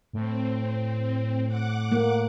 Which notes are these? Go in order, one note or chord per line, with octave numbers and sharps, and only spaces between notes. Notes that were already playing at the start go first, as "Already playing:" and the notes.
A2 C4
F#5 D6 F#6
A#3